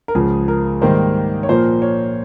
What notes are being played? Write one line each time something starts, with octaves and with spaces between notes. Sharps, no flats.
A#4
C#2 C#3 F3 G#4
A#4
G#2 D#3 G3 A#3 C5
C#5
A#2 F3 A#3 C5
C#5